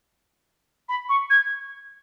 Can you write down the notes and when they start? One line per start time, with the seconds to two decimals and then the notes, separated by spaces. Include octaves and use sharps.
0.88 B5
1.09 C#6
1.30 G#6